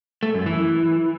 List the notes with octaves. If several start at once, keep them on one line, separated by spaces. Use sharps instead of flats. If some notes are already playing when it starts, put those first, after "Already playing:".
A3
F#2
E3